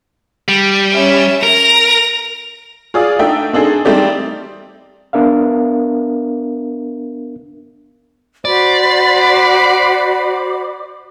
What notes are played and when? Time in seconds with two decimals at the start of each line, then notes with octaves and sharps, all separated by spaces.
0.48 G3
0.92 C#4 E5
1.43 A#4 A#6 F7
2.94 F4 G#4 D5 F5 D#6
3.19 A3 D4 D#4 E5 G5
3.53 C4 D4 D#4 G#4 A4
3.85 G3 A3 C4 D#4 G4 D5
5.13 B3 D4 A#4 E5 F5
8.45 F#4 C5 D5 B5